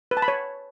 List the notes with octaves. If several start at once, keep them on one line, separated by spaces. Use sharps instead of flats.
B4
A5
B5
C#5